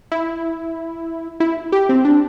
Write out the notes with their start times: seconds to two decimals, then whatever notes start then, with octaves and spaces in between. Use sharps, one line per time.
0.12 E4
1.40 E4
1.72 G4
1.89 C4
2.05 D4